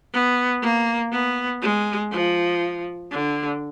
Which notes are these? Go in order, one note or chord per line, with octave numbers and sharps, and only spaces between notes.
B3
A#3
B3
G#3
F3
D3